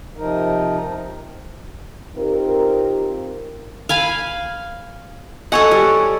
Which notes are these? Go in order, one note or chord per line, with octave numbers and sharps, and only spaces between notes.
C3 F3 D#4 A#4
C4 D#4 F4 G4 A#4
F5 G#5 B5
A4 C#5 D#5 F#5 G#5 C#6
G3